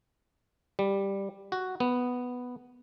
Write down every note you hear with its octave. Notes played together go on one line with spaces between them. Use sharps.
G3
F#4
B3